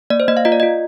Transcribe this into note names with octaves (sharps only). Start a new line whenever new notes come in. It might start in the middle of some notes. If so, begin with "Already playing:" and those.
A#3 D5
C5
A#3 D#5
F5
F4 D#5
D5
F4 D#5